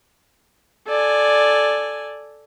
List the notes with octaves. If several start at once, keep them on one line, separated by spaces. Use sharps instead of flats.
A4 D5 G#5